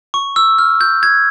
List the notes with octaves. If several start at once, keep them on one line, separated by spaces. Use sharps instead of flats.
C#6
E6
F6
G6
G#6